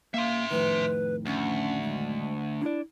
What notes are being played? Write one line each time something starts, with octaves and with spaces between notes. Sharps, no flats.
A#3 E5 F5 C6
F2 A2 D#3 B4
D2 C#4
G#3
D4 E4 D5